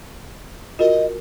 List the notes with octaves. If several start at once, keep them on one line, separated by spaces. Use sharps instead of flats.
F4 F#4 A#4 D#5